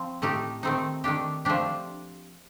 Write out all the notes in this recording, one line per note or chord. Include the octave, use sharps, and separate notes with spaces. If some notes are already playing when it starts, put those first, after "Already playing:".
Already playing: F3 C4
A2 A3 D#4 G4
D#3 A3 C4 D#4
D#3 A3 D4 G4
F3 A3 D4 G4